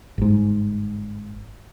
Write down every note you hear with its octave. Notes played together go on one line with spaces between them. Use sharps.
G1 G#2